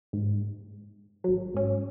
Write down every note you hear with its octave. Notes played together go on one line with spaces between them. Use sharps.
G#2
A1 F#3
G#2 C#4